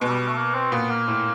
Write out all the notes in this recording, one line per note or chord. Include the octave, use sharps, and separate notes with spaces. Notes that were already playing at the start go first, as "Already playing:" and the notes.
B2 G#3
G3
G3
A3
A#3
C4
A#2 B3
A#3
A2